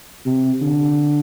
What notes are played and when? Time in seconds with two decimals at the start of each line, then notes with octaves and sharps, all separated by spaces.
0.25 C3
0.62 D3